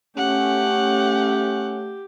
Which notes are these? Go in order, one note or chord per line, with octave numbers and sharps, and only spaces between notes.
A3 C#4 G4 F#5